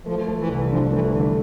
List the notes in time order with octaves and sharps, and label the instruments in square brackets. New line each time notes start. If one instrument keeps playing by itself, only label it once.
[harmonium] F3 [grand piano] A3
[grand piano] A3
[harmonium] E3
[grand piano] C2
[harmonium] F3 [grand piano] D4
[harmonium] E3 [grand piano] A3
[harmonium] D3 [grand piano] D4